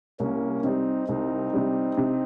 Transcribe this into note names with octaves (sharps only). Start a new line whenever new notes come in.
C2 A#3 C#4
C3 G3 C4 D#4
C2 C4 D#4
C3 G3
C3